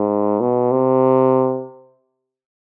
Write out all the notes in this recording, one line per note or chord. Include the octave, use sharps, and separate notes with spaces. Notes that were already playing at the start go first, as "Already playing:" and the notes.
Already playing: G#2
B2
C3